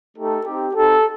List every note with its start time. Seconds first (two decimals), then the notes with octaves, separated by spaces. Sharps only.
0.17 A3 D#4 G4 A4
0.46 C4 D#4 G4
0.74 C4 D#4 G4 A4